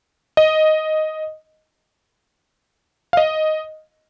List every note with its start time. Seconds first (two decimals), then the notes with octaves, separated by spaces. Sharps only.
0.37 D#5
3.13 F5
3.17 D#5